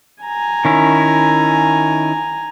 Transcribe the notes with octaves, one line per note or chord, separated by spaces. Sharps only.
G#5 A#5
D#3 C#4 E4